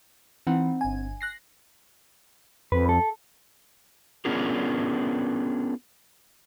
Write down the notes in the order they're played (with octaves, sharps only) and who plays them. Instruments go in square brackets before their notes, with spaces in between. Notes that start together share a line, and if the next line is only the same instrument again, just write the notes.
[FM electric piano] E3 [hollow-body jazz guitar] C4 D#4 F#5
[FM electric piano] G1 G#5
F#6 A#6 C7
[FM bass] F2 [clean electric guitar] B4
[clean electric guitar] A4
[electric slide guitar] B3 C#4 D4 F4 G#4 A#4